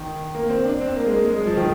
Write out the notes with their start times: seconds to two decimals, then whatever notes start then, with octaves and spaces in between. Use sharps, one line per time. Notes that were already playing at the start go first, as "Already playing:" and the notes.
Already playing: D#3
0.35 A#3
0.50 C4
0.65 D4
0.81 C4
0.96 A#3
1.06 G#3
1.11 A#3
1.26 G#3
1.37 G#3
1.47 F3
1.57 D#3